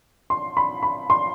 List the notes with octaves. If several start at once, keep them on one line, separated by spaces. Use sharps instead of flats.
C6
B5
B5
C6